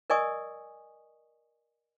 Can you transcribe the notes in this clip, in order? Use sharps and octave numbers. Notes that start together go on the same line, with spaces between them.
A#4 D5 D#5 G#5 C#6 D#6